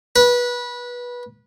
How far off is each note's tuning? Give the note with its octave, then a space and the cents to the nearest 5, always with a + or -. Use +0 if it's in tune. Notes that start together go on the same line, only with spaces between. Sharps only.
B4 -20